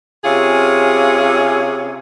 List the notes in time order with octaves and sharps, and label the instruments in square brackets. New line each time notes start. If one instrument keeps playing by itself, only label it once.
[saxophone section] C3 C#4 F4 G#4